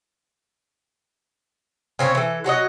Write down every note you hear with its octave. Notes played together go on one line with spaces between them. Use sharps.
C#3 C4 C#4 C#5
E3 A4
F#3 F#4 C#5 D#5